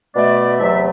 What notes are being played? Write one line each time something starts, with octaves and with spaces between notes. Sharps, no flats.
B2 A3 D5
E2 C3 F#3 A3 E5